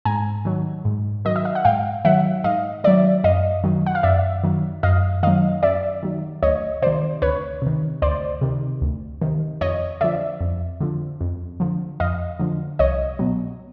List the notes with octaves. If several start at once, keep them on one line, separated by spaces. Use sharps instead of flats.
G#2 G#5 A#5
D#3 F#3
G#2
D#3 F#3 D#5
E5
F5
F#5
G#2 F5 G5
D#3 F#3 E5 F#5
G#2 D#5 F5
D#3 F#3 D5 E5
F#2 D#5 F5
D#3 F#3
F#5
F5
F#2 D5 E5
D#3 F#3
F#2 D#5 F5
D#3 F#3 D#5 F5
F#2 D5 E5
D#3 F#3
D2 C#5 D#5
C3 D#3 C5 D5
D2 B4 C#5
C3 D#3
D2 C5 D5
C3 D#3
D2
C3 D#3
F2 C#5 D#5
D3 F3 D5 E5
F2
D3 F3
F2
D3 F3
F2 D#5 F5
D3 F3
C2 C#5 D#5
B2 F#3